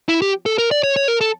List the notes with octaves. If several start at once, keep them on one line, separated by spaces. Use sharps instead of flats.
E4
G4
A4
A#4
D5
C#5
C#5
A#4
A4